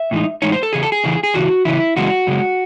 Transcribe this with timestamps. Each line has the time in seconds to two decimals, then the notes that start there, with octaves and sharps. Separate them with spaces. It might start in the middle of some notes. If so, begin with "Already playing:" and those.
Already playing: E5
0.11 A2 E3 G#3 D#4
0.42 A2 E3 G#3 D#4 C#5
0.52 C5
0.63 A4
0.73 E2 C#3 G#4
0.83 A4
0.92 G#4
1.04 E2 C#3 E3
1.23 G#4
1.34 E2 C#3 E3 F#4
1.65 E2 C#3 E3 E4
1.96 F#2 C#3 E3 G#3 F#4
2.27 F#2 C#3 G#3